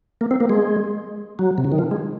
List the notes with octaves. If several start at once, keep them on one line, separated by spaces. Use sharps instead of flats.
A#3
C4
A#3
G#3
F#3
C3
C#3
D#3
F3
G#3